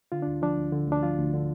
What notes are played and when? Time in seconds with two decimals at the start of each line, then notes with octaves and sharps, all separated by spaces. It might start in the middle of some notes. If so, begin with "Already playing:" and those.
0.12 D3 F4
0.22 D2 D4
0.42 F3 D4
0.57 D2
0.72 D3
0.88 D2 D4
1.03 F3 F4
1.18 D2
1.34 D3